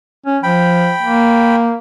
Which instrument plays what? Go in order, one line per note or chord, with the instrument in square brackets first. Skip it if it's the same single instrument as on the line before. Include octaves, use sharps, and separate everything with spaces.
[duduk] C#4
[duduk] F3 [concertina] G5 B5
[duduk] A#3